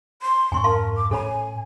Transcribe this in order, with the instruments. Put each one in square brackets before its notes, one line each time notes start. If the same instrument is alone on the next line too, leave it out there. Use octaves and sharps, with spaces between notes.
[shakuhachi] C6
[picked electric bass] F2 G#2 C#4 [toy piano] G#5 C6 C#6
[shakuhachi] A#4 [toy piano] F5 A5 C6
[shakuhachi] D6
[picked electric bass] A2 C#4 [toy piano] A4 C#5 B5 [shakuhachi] G#5